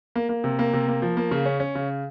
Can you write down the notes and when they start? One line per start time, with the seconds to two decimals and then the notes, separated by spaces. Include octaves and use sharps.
0.16 A#3
0.29 A#3
0.44 C3
0.59 A#3
0.73 C3
0.88 A#3
1.02 F3
1.17 A#3
1.31 C#3
1.45 C#4
1.60 C#4
1.75 C#3